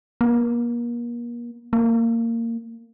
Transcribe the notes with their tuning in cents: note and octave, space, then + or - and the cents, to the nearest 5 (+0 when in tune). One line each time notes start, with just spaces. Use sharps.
A#3 +35
A#3 -20